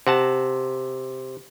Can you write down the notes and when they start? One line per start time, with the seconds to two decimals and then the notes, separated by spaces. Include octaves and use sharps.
0.07 C3 F#5 A5